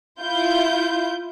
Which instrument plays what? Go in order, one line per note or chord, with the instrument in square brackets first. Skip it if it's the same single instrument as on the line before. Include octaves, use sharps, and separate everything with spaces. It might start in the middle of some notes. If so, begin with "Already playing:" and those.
[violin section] E4 F4 G6